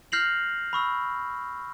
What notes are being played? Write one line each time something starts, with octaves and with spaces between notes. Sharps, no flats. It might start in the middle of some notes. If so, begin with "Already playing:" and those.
F6 G6 A#6 C7 F7 F#7
B5 C#6 E6